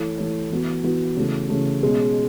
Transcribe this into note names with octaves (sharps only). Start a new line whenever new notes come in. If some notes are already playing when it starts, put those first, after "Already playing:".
Already playing: E3 A3 E4 A4 C#5
E3 A3 E4 A4 C#5
E3 B3 F#4
E3 B3 F#4
C#3 E3 A3
C#3 E3 A3
B2 G#3 C#4